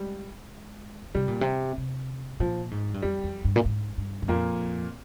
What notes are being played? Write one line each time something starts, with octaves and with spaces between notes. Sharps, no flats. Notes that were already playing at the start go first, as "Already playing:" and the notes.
Already playing: G3 G#3
C3 G3
A#2
C3
C3
A#2 F3
G#2
G2
F2 G3
F2
G2
A#2
G#2
G2
G2
F2 A#2 A#3